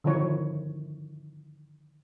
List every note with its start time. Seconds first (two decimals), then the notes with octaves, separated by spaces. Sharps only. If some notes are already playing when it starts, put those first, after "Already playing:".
0.04 D3 D#3 F3 E4 C#5